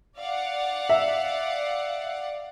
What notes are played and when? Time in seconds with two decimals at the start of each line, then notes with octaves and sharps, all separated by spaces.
0.16 D5 F5 F#5
0.89 E5